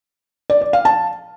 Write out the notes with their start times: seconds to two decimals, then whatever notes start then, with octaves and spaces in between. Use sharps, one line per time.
0.50 D5
0.61 D5
0.73 F5
0.85 A5